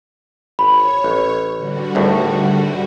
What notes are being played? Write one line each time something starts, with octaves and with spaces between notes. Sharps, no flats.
G#1 C#5 B5
A1
D3 G3 F#4
G#1 D2 A2